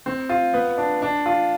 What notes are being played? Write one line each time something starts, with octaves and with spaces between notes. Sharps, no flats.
C4
F4
B3
D4
D4
F4